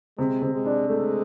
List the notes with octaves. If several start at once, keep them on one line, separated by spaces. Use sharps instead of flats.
C3 G#3
C3
G#3
D4
G#3 A3